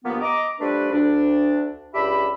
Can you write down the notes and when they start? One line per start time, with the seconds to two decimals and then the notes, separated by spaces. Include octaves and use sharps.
0.05 G2 F3 A#3 B3
0.21 D#5 A#5 D6
0.60 F3 G3 A3 D4 B4
0.92 D2 D4
1.94 C#2 D4 G4 E5 B5